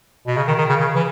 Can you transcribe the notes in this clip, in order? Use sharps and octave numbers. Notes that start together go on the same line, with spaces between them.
B2
C#3
D#3
D#3
C#3
C#3
E3